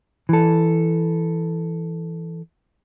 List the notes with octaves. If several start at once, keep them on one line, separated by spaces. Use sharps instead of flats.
E3 A4